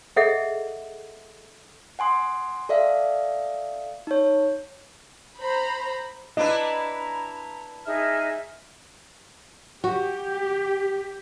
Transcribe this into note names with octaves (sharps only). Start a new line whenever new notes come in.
G#4 A4 D#5 E5 F#5
F#5 G#5 C6 D#6
A4 D5 E5 F5
D#4 C#5
C5 A#5 B5
D4 E4 B4 D#5 A#5
D#4 G#4 E5 F6
F#4 G4